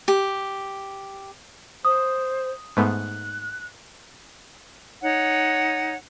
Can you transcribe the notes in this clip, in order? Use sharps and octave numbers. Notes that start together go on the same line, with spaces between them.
G4
C5 D#6
G#2 A3 B3 F#6
D#4 C#5 F#5